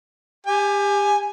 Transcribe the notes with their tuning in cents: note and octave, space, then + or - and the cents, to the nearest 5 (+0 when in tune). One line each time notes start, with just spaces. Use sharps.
G4 +25 G#5 +0